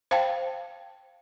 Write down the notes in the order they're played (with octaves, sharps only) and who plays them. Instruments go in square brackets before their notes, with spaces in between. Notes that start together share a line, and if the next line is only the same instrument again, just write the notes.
[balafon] C5 F5 G5 A5